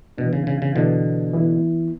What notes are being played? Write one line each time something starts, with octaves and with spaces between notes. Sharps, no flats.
B2 E3 B3 D4
C#3
C#3
C#3
B2 D3 E3 B3 D4
E3 B3 E4